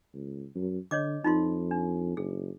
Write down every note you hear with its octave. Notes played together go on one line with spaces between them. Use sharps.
C#2
F#2
D3 C#5 D#5 D6
F2 D#4 F4 C6
D4
F#1 G#4